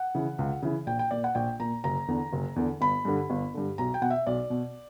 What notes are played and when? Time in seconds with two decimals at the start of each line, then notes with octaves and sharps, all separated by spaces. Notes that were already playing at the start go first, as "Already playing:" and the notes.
Already playing: F#5
0.15 C#3 E3
0.39 C#2
0.62 C#3 E3
0.87 A#1 G5
0.99 G5
1.11 A#2 D5
1.24 F#5
1.35 A#1 G5
1.60 A#2 A#5
1.84 F#1 A#5
2.08 E2 D3
2.33 F#1
2.56 E2 D3
2.81 G1 B5
3.05 G2 D3
3.30 G1
3.54 G2 D3
3.78 B1 A#5
3.94 G5
4.02 B2 F#5
4.10 E5
4.26 B1 D5
4.50 B2